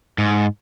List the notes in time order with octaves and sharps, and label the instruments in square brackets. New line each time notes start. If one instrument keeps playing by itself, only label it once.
[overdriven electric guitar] G#2